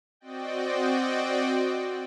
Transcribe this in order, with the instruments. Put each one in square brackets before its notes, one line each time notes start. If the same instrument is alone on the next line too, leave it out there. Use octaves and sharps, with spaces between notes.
[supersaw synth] C4 F#4 D5 D#5 G5